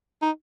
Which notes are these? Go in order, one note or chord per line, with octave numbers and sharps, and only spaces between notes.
D#4